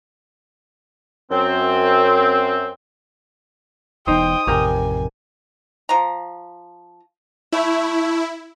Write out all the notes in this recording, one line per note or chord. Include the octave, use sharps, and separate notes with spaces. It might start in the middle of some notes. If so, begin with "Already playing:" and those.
F#2 C4
E1 E2 D#4 C5 G5 D#6
A1 F2 C3 G4 A#4 G5 G#5
F3 A#5
A3 E4 E5